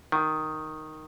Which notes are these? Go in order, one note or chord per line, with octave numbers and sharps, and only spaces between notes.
D#3